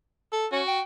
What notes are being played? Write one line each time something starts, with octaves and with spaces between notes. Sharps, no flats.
A4
C#4 F#4
G5